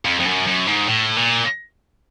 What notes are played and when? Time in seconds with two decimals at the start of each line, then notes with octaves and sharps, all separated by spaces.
0.05 F2
0.20 F2
0.25 F#2
0.47 F#2
0.67 G#2
0.88 A2
1.17 A#2